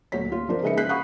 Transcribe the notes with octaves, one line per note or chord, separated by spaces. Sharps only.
D2 A#2 F#3 C#5 B6
F4
F3 D4 A#4 C5
C#3 G#3 D#4 B4 E5 C#7
C#3 F#6 B6 C7
F5 F#5 B5 C#6 D#6 F#6